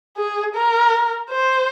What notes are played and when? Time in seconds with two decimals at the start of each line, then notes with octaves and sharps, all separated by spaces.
0.17 G#4
0.55 A#4
1.30 C5